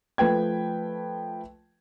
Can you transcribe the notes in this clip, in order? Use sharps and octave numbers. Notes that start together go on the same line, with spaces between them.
F3 A3 B4 G5 G#6